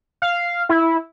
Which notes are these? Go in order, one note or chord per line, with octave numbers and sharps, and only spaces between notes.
F5
E4